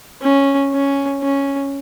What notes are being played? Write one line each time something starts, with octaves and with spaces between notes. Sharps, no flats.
C#4
C#4
C#4